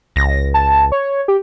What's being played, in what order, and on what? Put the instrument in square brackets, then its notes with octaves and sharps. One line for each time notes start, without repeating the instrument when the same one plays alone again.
[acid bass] C#2 [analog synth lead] A#6
[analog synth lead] A5
C#5
G4